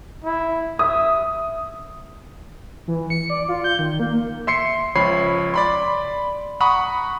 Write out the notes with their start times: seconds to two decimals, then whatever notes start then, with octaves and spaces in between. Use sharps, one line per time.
0.24 E4
0.79 E5 D#6
2.88 E3
3.10 C#7
3.30 D5
3.49 F4
3.64 G6
3.79 D#3
4.00 A#3
4.47 E5 C6 C7 C#7
4.95 C#2 F3 C#5 B5 C7
5.54 D5 B5 C6
6.60 F#5 A#5 B5 C#6 D#6